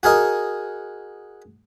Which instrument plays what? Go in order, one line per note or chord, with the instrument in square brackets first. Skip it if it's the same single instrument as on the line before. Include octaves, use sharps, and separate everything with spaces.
[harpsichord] F#4 G#4 A#4 D#5